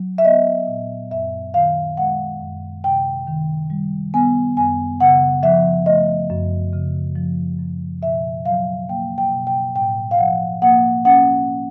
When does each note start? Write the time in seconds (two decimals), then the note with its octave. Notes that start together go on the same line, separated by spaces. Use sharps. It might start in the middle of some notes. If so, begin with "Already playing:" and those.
Already playing: F#3
0.18 E5
0.25 B3 D#5
0.67 A#2
1.11 F#2 E5
1.54 D#3 F5
1.97 G#3 F#5
2.41 F#2
2.84 C3 G5
3.28 D#3
3.70 G3
4.14 B3 G#5
4.57 F#2 G#5
5.00 C#3 F#5
5.43 F3 E5
5.86 A3 D#5
6.30 F#2
6.73 C#3
7.16 F3
7.59 F#2
8.02 B2 E5
8.45 F#3 F5
8.89 A#3 G5
9.18 G5
9.32 B2
9.47 G5
9.75 A2 G5
10.11 F5
10.18 F3 F#5
10.62 A#3 F#5
11.05 C#4 F#5